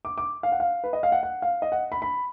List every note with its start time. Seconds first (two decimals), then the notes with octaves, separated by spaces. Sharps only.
0.05 D6
0.18 D6
0.43 F5
0.52 F#5
0.60 F5
0.84 B4
0.93 D#5
1.03 F5
1.12 F#5
1.23 F#5
1.42 F5
1.62 D#5
1.72 F#5
1.92 B5
2.02 B5